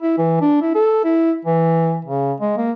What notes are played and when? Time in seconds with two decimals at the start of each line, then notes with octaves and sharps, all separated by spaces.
0.02 E4
0.18 E3
0.41 D4
0.62 E4
0.75 A4
1.04 E4
1.45 E3
2.05 C#3
2.40 G#3
2.57 A#3